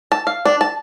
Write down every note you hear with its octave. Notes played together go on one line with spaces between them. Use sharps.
A5
F5
D4
A5